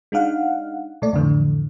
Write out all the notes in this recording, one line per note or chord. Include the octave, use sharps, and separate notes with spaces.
G#3 D4 D#4 F5 F#5
A#2 A3 D5
F2 A2 D3 E3